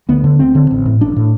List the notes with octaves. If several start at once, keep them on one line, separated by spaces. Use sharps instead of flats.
D2 B3
D3
D2 C4
D3
A1
A2
A1 D4
A2